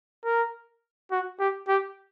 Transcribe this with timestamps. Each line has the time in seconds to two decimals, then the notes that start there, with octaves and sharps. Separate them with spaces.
0.25 A#4
1.11 F#4
1.40 G4
1.68 G4